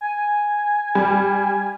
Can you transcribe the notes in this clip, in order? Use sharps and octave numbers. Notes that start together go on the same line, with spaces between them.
G#5
G3